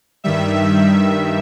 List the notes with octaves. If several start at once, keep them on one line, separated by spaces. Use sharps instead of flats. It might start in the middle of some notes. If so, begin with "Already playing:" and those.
G2 D#3 G3 E5